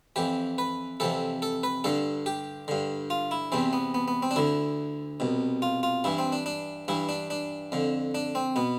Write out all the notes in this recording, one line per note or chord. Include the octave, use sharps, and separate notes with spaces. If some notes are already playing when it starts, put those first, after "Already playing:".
F2 E3 G4
B4
F2 C3 E3 A4
A4
B4
G2 D3 A4
G4
G2 D3
F4
E4
E2 C3 E3 C4
B3
B3
B3
C4
D4
D2 D3 E4
C2 B2
F4
F4
G2 E3 E4
C4
D4
D4
G2 E3 E4
D4
D4
F2 D3
D4
C4
B2 B3